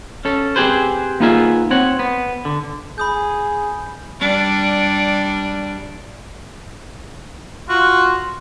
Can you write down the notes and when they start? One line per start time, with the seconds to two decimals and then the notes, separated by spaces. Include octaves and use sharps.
0.25 C#4 A4
0.56 C4 G4 G#4 B4 C5
1.20 A#3 B3 D#4 F4 G#4 E5
1.71 C4 C#5 F#5
1.99 B3
2.45 D3
2.98 G#4 B5 D#6 G6
4.20 G3 D4
7.69 F4 F#4